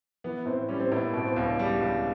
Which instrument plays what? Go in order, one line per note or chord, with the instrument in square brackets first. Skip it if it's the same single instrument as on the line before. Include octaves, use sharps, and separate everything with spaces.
[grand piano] E3 [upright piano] B3
[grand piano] A2 [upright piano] C4
[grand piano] G3 [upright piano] C#4
[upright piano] C4
[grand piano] A2 [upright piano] B3
[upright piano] A#3
[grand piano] B2 [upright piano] B3
[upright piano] C4
[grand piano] C#2 [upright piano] C#4
[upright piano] D4
[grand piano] G3
C#2